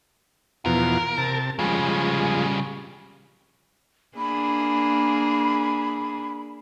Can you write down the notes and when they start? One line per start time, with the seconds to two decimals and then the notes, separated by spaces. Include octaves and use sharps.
0.66 E2 B2 F3 A#4
1.18 C3 A5
1.59 C#3 F3 G3 G#3
4.18 A#3 D4 G#4 B5